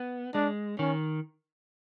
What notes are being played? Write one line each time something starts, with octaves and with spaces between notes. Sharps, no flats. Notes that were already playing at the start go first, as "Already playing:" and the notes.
Already playing: B3
G#3 D4
D#3 C#4